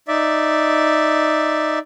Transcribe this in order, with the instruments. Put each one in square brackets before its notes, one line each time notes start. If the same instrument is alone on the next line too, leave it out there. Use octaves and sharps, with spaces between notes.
[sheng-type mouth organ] D#4 D5 E5